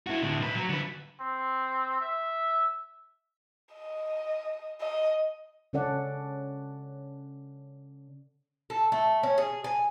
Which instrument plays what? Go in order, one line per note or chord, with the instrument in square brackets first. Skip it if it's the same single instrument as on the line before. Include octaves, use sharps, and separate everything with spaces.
[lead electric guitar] E4 F#4
A2 D3
B1 B4
F#3
D3 B4
[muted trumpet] C4
E5
[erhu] D#5
D#5
[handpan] C#3 C#4 A4 D5 F#5
[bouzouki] A4
A3
C#4
G#4
G#5